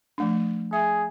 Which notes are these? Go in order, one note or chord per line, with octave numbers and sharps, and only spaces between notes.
F3 A3 D4
G#4 E5